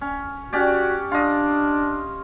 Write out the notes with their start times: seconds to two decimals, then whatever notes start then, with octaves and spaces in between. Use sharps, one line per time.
0.01 C#4
0.53 C#4 F#4 G4 D5
1.11 D4 F4 D#5